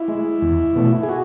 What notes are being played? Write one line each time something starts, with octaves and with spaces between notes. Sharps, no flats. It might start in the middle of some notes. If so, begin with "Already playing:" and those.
Already playing: E4
G#3
E2
B2 A3
G#4
F#4